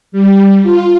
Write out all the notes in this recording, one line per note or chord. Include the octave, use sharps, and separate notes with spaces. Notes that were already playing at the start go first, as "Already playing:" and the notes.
G3
F4